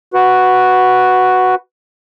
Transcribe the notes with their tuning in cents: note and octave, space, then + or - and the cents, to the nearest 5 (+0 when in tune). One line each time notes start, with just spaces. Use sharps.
F#4 +0 B4 +0